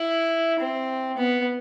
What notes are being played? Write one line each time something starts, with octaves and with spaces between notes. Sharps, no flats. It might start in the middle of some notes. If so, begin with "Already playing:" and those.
Already playing: E4
C4
B3